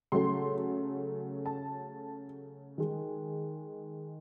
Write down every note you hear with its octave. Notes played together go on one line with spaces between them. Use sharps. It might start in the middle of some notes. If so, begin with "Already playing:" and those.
C#3 F#3 A3 C6
A5
D#3 G#3